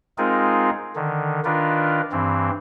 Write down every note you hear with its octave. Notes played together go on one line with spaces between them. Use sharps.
G#3 C4 D#4 F4 G#4 A#4
D3 D#3
D#3 D4 F4 A#4 B4
G2 E3 C4